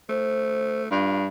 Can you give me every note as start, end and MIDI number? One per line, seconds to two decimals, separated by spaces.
0.09 0.91 57
0.09 0.83 72
0.91 1.27 43
0.91 1.20 65